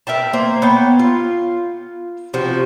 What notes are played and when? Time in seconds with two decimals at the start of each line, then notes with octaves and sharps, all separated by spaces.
0.07 A#4 E5 G5 A5
0.33 A#3 C5
0.62 B3 C#5 G5
0.99 F4
2.34 C3 F3 F#4